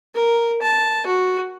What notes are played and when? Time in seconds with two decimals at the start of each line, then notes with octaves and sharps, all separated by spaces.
0.15 A#4
0.62 A5
1.06 F#4